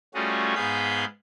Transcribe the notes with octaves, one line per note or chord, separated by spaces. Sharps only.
G3 A3 C#4 F4 F#4 G#4
G#2 B3 G#4 F5 B5 G6